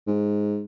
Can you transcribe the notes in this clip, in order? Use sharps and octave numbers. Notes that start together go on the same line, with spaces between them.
G#2